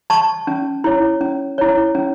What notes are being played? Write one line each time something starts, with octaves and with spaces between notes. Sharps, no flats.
A5 C#6
C#4
E4 C#5
C#4
E4 C#5
C#4